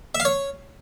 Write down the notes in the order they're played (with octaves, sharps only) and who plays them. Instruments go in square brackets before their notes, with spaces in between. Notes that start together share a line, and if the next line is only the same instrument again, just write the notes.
[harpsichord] E5
F5
C#5